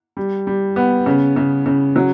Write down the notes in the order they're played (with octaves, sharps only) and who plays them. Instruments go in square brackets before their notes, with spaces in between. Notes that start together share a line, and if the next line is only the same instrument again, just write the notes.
[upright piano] G3
G3
B3
C#3
C#3
C#3
F#3